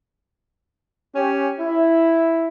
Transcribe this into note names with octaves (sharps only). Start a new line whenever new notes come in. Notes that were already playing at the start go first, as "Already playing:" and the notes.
C#4 G4
E4